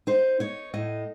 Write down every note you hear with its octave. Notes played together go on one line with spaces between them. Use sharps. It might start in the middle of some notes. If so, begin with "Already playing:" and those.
D#4 C5
D#4 C#5
A2 D#5